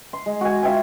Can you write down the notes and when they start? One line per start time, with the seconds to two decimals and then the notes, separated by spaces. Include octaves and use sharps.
0.13 C6
0.26 G#3
0.41 F#4 G#5
0.62 F4 E5 G5 G#5